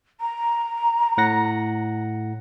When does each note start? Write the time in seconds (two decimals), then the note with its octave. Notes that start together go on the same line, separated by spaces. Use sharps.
0.21 A#5
1.18 A2 F#5 A#6